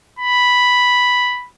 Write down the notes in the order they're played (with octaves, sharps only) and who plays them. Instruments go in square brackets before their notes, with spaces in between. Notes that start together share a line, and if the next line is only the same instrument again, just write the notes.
[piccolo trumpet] B5